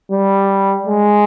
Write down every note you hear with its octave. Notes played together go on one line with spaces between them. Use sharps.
G3
G#3